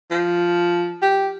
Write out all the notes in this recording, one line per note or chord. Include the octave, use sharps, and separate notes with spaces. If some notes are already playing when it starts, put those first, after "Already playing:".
F3
G4